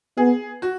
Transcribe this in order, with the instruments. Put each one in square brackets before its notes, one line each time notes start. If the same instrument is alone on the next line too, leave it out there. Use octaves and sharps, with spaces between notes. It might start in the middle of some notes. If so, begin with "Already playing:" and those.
[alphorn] B3 [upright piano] G#4
[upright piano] F#4